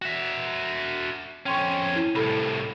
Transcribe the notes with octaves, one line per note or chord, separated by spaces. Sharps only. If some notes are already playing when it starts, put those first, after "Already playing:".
F#4 E5
F2 C#4 G5 C6 C#6
E4 D#7
C2 A2 A4 B5 E7